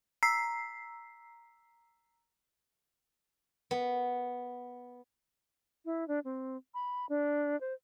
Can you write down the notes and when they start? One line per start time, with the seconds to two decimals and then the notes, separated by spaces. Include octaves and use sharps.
0.23 A#5 E6 B6 C7
3.71 B3
5.85 E4
6.08 D4
6.25 C4
6.74 B5
7.09 D4
7.61 C5